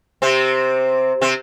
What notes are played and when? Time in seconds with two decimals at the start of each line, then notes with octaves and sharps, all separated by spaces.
0.22 C3 C4
1.21 C3 C4